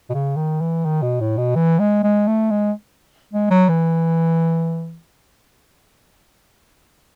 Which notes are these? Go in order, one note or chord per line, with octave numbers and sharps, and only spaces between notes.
B2
C#3
D#3
E3
D#3
B2
A2
B2
E3
G#3
G#3
A3
G#3
G#3
F#3
E3